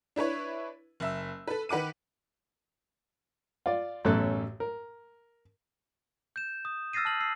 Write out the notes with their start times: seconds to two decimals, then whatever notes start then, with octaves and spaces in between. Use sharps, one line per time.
0.16 D4 E4 B4 C#5
1.00 F#1 E5 E6
1.48 A4 B4
1.69 D#3 B4 F#5 D6 D#7
3.66 F4 D5
4.05 A1 F#2 B2 C#4 A4 F#6
4.60 A#4
6.36 G6 E7
6.65 D#6
6.93 E6 F6 A6 A#6 C7 D#7
7.05 A5 F6 F#7
7.20 E6 C7